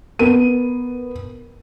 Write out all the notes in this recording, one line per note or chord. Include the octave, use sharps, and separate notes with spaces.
B3 A#4 D#7